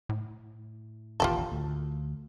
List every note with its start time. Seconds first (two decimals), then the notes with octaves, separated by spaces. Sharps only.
0.09 A2
1.20 E1 A1 D#2 F4 G4 A4
1.52 D2